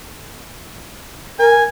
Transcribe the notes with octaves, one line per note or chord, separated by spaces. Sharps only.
A#4 G#5